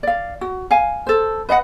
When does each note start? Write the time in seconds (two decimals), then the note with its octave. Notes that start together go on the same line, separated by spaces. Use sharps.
0.03 D5 F5
0.41 F#4
0.71 F5 G#5
1.07 A4 C5
1.49 B4 D#5 F5 F#5